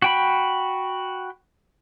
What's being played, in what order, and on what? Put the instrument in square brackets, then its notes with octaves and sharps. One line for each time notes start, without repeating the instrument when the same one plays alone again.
[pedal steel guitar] F#4 G5 B5